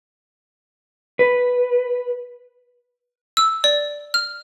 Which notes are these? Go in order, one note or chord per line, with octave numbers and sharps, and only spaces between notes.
B4
E6
D5
F6